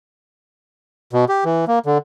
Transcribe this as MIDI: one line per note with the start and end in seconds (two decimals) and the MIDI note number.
1.13 1.25 47
1.29 1.44 67
1.45 1.65 52
1.67 1.79 58
1.86 1.98 50